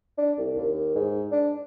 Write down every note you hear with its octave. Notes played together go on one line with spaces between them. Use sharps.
D4
C2
D#2
G#2
D4